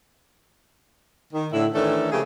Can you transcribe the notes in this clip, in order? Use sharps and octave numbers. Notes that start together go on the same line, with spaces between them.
D#3
A2 D3 E4
D#3 E3 A3 C#4 D4 A4
C#3 F3 A3 A#3 G4 G#4